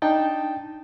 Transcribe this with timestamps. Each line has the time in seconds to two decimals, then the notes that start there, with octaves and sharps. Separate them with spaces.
0.02 D4 D#4 G5 A5